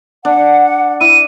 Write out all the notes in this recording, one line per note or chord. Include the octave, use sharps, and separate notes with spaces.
D4 F#5
E4 D#7